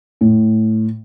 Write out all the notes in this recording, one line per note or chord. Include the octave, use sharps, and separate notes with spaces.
A2